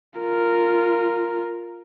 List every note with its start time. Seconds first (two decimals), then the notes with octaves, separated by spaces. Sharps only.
0.19 F4 A#4